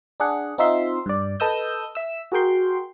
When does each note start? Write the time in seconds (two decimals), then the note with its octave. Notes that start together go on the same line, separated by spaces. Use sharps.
0.20 D4 G#4 F#5
0.58 C4 D#4 F4 E5 C6
1.06 G2 D5
1.40 A4 B4 D#5 D#6 E6 G6
1.95 E5 E6
2.32 F#4 G#4 A#4 G5 C6